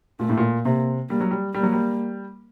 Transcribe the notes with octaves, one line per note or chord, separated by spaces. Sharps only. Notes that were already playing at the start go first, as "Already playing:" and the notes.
A#2 A3
A2
A#2
C3 A#3
G3 A#3
F#3
G3
G3 A#3
F#3
G3